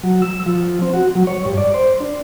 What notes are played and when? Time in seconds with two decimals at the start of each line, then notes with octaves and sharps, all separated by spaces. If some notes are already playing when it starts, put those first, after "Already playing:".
0.03 F#3
0.22 E6
0.46 F3
0.82 C4
0.93 F#4
1.15 F#3
1.27 C#5
1.45 G2
1.57 D5
1.74 C5
2.00 D4